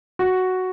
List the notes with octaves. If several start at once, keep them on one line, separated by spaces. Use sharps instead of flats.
F#4